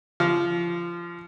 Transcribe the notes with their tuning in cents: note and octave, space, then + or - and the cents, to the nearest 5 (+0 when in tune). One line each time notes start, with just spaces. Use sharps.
F3 -20 F5 +0 D6 -40